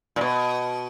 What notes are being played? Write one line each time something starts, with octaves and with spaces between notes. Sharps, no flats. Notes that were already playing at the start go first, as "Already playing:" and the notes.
A#2
B2